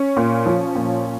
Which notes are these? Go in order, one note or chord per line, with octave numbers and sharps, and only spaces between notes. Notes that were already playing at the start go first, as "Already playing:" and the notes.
Already playing: C#4
A#2
F3
A#2